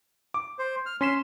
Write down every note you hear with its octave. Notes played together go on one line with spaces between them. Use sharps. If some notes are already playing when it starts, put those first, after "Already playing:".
D6
C5
F6
C#4 C6 B6 E7